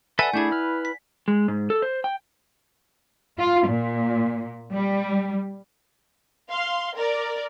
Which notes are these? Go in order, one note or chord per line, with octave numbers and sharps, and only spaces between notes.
A4 B4 D5 E5 F#5 G#5
A3 D4 E4 G#4 G6 G#6
B4 F6
B6
G#3
G#2
A4
C5
G5
F4
A#2
G3
F5 C6
A#4 D5